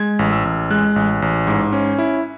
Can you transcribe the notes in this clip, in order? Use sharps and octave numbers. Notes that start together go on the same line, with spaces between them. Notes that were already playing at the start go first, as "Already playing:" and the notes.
Already playing: G#3 G#6
A1
E6
A1
G#3 F#6
A1
A1
G#2
C#4
E4